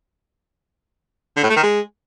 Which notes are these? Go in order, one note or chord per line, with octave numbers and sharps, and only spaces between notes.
D3
A2
A3
D#3
G#3